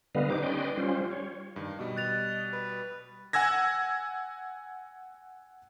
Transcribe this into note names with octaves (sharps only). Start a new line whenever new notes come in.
D3 G3 B3 B4 D#5 F5
D#4 G4 C5 D6
C#4 B4 D5 D#5 G5 C6
G3 C#4 F4 C5
C#5
G2 D#3
B2 G3 D#5
F#6 A6 F7
B4
F#5 G#5 E6 G#6 A#6